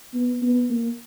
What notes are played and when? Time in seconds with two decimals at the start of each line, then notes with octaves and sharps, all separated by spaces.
0.14 B3
0.42 B3
0.70 A#3